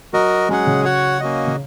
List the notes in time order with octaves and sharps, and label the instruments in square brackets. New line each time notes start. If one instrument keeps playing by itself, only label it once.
[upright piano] F#3 [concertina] F#4 A#4 D#5
[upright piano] F#3 [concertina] G#3 C#4 G#4 F#5
[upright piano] C#3
[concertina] F#4 C#5 F#5
A#3 C#4 F#4 D#5
[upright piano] C#3